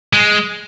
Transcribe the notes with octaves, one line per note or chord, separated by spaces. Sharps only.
G#3